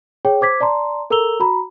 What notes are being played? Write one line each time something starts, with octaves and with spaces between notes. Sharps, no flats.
G#4 C#5 G5
C5 D6 G#6 B6
D5 A5 A#5 C6
A4 A#4 A#5 E6 F7 G7
F#4 A#5 B5